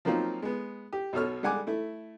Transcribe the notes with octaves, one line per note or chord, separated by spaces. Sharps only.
F3 F#3 A#3 C4 D#4 F4
G#3 B3
G4
B1 B2 A4 C#5 F6
G3 G#3 F#5 G#5 D6
A3 E4